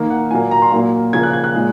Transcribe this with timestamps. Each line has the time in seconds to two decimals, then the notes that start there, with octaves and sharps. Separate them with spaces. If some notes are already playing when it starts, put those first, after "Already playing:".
Already playing: D#3 A#3
0.10 F#5
0.31 A#2 F#3 A#3 G#5
0.51 A#5
0.62 C6
0.72 A#2 F#3 A#3
1.13 C#3 F3 A#3 G#6
1.23 F#6
1.33 G#6
1.44 F#6
1.54 A#2 G#3